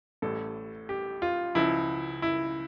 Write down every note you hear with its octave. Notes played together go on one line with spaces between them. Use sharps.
A1 A2 G3 A4
G4
F4
C#2 C#3 F3 E4
E4